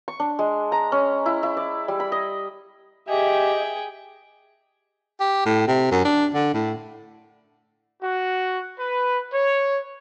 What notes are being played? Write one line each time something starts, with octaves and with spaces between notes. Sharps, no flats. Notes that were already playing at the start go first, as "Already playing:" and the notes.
C#6
D4
G#3
A#5
C#4
E4
E4
D5
G3
B5
D#5
G4 G#4 D#5 E5 G5
G4
A2
C3
F#2
D4
D3
A2
F#4
B4
C#5